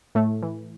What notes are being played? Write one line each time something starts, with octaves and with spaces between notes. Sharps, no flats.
A2 A3
E3